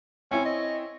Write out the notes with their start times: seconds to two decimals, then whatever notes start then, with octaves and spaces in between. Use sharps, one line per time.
0.31 C4 C#4 E4 C#5
0.45 D#5